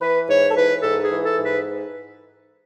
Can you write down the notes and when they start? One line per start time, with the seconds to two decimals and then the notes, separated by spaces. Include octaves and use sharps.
0.01 E3 B4
0.28 G#2 C#5
0.51 A4
0.56 E3 B4
0.83 G#2 A4
1.04 G#4
1.11 E3
1.24 A4
1.37 G#2
1.44 B4